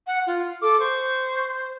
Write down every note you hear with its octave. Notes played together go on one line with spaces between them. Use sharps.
F#5
F4
A4 D6
C5 C#6